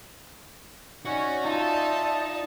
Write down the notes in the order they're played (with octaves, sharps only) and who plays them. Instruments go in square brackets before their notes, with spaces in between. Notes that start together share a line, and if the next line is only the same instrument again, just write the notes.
[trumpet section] C#4 [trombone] D#4 [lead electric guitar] F#4 [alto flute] D5
[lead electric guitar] D#4 [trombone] F4 [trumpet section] E5 A5